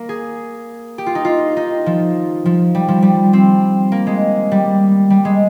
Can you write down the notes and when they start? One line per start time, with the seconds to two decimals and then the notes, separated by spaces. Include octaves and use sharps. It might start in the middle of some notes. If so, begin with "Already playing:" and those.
Already playing: A#3
0.09 G#4
0.98 G4
1.06 F4
1.15 D#4
1.25 F4
1.57 D#4
1.86 F3
2.45 F3
2.75 G3
2.88 F3
3.02 G3
3.33 C4
3.92 A#3
4.07 G#3
4.52 G3
5.10 G3
5.25 G#3